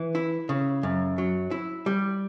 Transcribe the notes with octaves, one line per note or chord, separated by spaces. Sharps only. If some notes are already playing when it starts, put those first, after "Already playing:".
Already playing: E3
E4
C#3
F#2
F#3
E4
G3